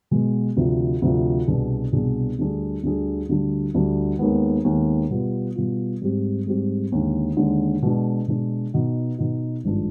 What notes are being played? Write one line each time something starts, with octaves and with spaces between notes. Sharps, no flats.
B2 G#3 B3
D2 C3 F3
D2 C3 F3
C2 B2 B3 D4 G#4
C2 B2 B3 D4 G#4
D2 D3 G3 D4 G#4
D2 D3 G3 D4 G#4
D2 D3 G3 D4
D2 D3 G3 D4
D#2 D#3 G#3 B3
D#2 D#3 G#3 B3
B2 G3 B3 F4
B2 G3 B3 F4
G#2 G3 C4 G4
G#2 G3 C4 G4
D#2 D3 G#3
D#2 D3 G#3
B2 G#3 D4
B2 G#3 D4
B2 B3 D#4
B2 B3 D#4
G#1 G2 F3 G#3 D4